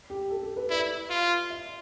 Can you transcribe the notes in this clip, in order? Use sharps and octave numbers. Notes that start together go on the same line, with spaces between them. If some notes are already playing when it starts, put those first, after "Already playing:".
G4
A4
A4
B4
E4 D5
F4
E5